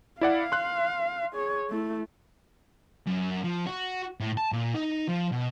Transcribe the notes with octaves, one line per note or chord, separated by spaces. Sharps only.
E4 D5 F5 F#5
C6 F#6
G#4 C#5
A3 E4
F#2
F3
F#4
A2
A5
A#2
D#4
F3
B2